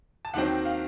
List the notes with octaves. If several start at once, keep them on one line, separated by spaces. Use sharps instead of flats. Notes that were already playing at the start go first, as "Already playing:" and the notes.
A5
D#2 D#3 F#3 C4 F#5
F5